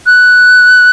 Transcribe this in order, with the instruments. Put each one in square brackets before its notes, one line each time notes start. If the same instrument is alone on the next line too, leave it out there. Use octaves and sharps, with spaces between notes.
[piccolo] F#6